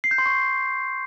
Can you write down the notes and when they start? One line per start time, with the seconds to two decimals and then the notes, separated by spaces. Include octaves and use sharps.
0.04 C7
0.11 G6
0.18 C6
0.26 C#6